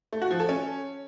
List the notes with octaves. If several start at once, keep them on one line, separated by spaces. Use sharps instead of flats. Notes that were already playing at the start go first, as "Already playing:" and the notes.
A3
F#4
F3
A4
C#4